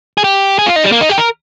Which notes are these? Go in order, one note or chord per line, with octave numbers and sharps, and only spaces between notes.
G#4
G4
G#4
F4
D#4
G3
A#3
D#4
G4
A#4